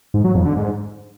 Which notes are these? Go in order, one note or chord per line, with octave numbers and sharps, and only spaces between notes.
G#2
F#3
F2
D3
G#2